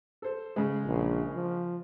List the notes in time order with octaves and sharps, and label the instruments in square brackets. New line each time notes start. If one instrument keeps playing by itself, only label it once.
[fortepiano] A4 C5
C#3 G#3
[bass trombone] A#1
F3